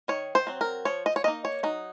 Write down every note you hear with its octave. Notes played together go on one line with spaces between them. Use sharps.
D#3 C#5
C5
F#3 C4
A#4
F3 C#5
D#5
C#5
A#3 D#4 D#5
C#5
F#3 D#4